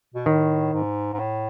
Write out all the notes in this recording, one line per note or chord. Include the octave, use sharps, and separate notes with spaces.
B2
A2 D#3
G#2
G#2
A2